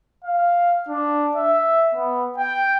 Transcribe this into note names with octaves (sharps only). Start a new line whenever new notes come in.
F5
D4
E5
B3
G5